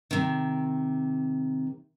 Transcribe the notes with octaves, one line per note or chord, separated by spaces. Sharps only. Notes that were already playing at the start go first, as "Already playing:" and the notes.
C3 D#3